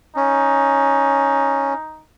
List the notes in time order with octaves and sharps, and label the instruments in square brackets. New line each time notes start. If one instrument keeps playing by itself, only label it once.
[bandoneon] C#4 [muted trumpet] D#4